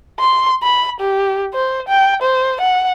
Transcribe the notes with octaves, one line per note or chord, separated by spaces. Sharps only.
C6
B5
G4
C5
G5
C5
F#5